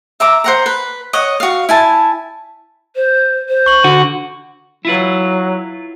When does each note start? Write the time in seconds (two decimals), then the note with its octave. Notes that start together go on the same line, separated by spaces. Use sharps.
0.20 E5 A#5 D6
0.44 C5 F#5 A#5
0.66 B4
1.13 C#5 D#5 F#5
1.40 F#4 F5
1.69 E4 G#5 A5
2.96 C5
3.49 C5
3.66 C#6 F#7
3.84 D3 F#4
4.85 F#3 E4 F4 B4